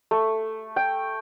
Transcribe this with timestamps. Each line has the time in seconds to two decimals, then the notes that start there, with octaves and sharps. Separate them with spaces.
0.11 A3
0.76 G5